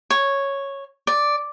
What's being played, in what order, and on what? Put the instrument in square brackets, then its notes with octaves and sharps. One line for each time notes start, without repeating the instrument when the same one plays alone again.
[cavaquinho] C#5
D5